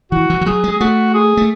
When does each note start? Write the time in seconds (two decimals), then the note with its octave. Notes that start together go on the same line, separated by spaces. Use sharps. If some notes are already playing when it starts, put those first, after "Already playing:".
0.12 E3 F#4
0.30 E3
0.41 E3
0.46 F#3 G#4
0.64 G#3
0.72 G#4
0.81 A3 F#4
1.14 G#4
1.37 A3